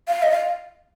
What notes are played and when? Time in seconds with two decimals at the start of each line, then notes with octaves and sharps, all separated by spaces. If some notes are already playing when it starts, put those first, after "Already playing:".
0.08 F5
0.23 D#5
0.31 F5